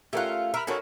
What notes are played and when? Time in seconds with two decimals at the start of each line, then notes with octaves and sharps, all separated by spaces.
0.13 A3 C#4 F4 G4 A#4 F#5
0.54 A#4 E5 B5
0.67 C#4 D#4 F#4 A4 A#4 C#5